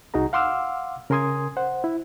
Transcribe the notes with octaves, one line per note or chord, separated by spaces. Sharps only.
C2 D#4 F#4 G#4 A#5
F5 F#5 C6 D6 E6 F6
C#3 A#4 G#5 C6 D#6 G#6
C5 F#5
E4